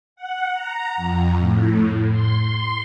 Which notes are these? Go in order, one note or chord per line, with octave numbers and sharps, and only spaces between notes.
F#5
A#5
F2
A2
C6
C6